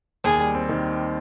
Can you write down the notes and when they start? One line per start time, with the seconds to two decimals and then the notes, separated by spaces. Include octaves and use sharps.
0.24 D#2 G#4
0.39 G3
0.54 C4
0.69 D#3